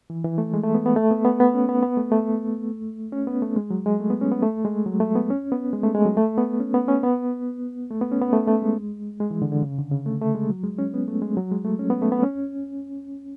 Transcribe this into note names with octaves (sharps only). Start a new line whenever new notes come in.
E3
E3
A3
G#3
A3
B3
B3
A3
B3
B3
B3
C#4
B3
B3
A3
A3
C#4
B3
A3
G#3
F#3
G#3
A3
B3
C#4
B3
A3
G#3
F#3
A3
B3
C#4
B3
G#3
A3
G#3
F#3
A3
B3
C#4
B3
C#4
B3
A3
B3
C#4
B3
A3
A3
G#3
G#3
E3
D3
D3
C#3
D3
C#3
A3
A3
G#3
F#3
G#3
C#4
B3
A3
G#3
F#3
G#3
A3
C#4
B3
A3
B3
C#4